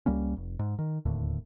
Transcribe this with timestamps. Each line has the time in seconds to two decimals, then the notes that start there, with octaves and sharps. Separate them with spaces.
0.06 C#2 G3 A#3 C#4
0.37 F1
0.59 G#2
0.79 D#3
1.05 D1 D#2 A2 D3